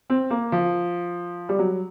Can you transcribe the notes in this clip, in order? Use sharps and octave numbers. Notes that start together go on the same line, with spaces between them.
C4
A#3
F3
G3
F#3